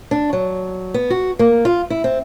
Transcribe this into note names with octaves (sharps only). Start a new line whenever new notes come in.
D4
F#3
B3
F#4
A#3
F4
E4
C4